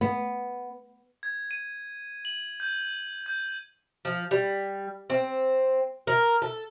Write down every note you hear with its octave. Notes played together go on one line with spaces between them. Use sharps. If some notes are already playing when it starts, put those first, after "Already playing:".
B3
G#6
D#7
F#7
G6
G6
F3
G3
C4
A#4
A4